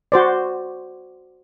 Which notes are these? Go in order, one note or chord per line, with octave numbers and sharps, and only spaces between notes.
F#4 C5 D5